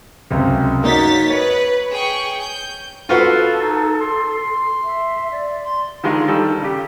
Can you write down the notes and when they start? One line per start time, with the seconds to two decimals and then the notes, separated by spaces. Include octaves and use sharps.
0.30 C#2 F#2 C3
0.84 A#3 D#4 F#4 C#5 A6 B6
1.30 B4 C#5
1.91 G#4 G5 C#6
2.41 G6
3.09 F4 F#4 A4 B4 F5
3.62 D#4
4.01 C6
4.84 E5
5.32 D5
5.64 C6
6.04 D3 D#3 G#3 F4
6.28 D#3 G3 A4
6.62 C#3 G4